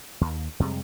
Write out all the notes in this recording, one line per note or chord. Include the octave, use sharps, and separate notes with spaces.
D#2
F2 C3 G3 G#3